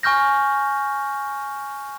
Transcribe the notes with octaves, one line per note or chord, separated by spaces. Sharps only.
G#5 C#6 F6 G6 A#6